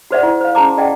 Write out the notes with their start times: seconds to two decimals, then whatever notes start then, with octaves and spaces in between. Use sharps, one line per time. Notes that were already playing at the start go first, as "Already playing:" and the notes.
0.11 F#4 G#4 C5 D5 E5 F#5
0.23 E4
0.41 C5 F5
0.55 C#4 F#4 G#4 A5 A#5 D6
0.78 G#4 D5 D#5 F#5 G5